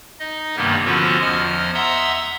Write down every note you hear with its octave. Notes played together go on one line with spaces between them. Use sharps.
D#4 D#5
G2 C3 D#3 G3 A#3 B3
D3 F3 B3 C#4 F4 F#4
E2 F3 D#5 F6
E5 F#5 A#5 C6 D#6 E6